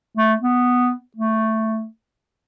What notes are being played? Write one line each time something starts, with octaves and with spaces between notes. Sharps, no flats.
A3
B3
A3